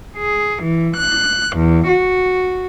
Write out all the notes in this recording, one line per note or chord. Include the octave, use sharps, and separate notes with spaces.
G#4
E3
F#6
E2
F#4